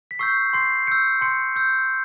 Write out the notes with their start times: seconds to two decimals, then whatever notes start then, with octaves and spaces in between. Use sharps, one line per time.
0.11 B6
0.19 C#6 E6 G6 C7
0.53 C6 C7
0.87 E6 G6 C#7
1.21 C6 C#7
1.56 E6 G6